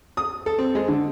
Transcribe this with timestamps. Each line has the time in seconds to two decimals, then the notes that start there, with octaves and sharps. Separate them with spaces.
0.17 D#6
0.46 A4
0.59 C4
0.75 G#3
0.88 D3